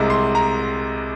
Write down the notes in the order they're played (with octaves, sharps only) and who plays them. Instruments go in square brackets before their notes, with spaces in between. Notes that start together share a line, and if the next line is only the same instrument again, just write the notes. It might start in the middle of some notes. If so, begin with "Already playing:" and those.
Already playing: [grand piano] C2 C3 G#3 A#5
C6
A#5